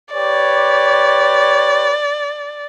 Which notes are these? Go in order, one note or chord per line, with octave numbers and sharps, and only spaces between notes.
G4 B4 C#5 D5